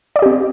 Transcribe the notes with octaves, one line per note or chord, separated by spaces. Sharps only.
C4 G4 D5 D#5